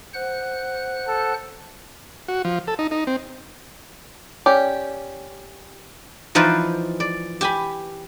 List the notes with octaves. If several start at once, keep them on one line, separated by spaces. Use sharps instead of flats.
C5 F#5 F#6
A4
F#4
F3
A4
D#4
D#4
C4
C#4 G4 D5
E3 F3 D#4 B4 C5 D5
D5
G4 G#5 B5